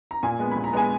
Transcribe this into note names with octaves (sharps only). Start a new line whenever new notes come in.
A#5
A#2 G#5
G#3 B3
A#2 B5
A#5
G#3 B3 G#5